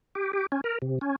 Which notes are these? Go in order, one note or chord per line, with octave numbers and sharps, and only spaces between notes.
G4
G4
C#4
A#4
C3
C#4